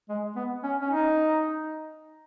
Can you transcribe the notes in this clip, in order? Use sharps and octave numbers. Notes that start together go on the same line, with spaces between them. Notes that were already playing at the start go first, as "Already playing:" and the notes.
G#3
B3
C#4
C#4
D#4